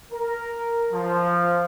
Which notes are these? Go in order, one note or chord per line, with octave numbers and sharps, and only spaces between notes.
A#4
F3